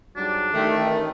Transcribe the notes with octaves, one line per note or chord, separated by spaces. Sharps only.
G#2 F#3 G3 D4
A1 D#3 A3